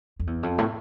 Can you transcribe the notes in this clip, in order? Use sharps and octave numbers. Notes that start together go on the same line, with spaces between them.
F2
E2
F2
A2